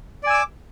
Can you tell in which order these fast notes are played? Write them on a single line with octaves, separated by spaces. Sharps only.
D5 G#5 E6 D6